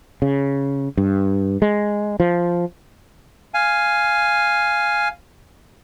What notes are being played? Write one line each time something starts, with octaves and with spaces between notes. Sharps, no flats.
C#3
G2
G#3
F3
F5 G#5